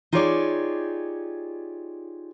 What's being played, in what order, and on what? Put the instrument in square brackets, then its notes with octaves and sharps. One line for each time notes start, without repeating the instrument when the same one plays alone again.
[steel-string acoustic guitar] D#4 F4 G4 G#4 C#5 D5